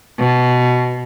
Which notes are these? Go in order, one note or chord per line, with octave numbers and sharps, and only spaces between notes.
B2